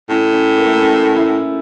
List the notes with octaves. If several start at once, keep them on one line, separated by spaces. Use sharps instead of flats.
A2 C#4
C#4
A#3
A3
A#3
C#4
E4